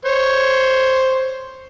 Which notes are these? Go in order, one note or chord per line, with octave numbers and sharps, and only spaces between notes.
C5 C#5